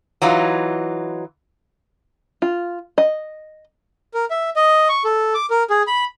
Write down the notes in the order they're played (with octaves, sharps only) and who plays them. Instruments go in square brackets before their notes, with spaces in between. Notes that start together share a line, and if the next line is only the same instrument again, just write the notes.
[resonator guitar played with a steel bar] E3 F#3 D#4 F4
[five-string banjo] F4
D#5
[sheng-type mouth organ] A#4
E5
D#5
C#6
A4
D6
A#4
G#4
B5